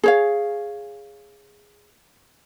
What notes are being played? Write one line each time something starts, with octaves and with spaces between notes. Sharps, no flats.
G#4 C#5 F5